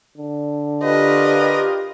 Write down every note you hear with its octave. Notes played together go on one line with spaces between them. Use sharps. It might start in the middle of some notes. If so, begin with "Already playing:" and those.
D3
F4 G4 A#4 B4 D#5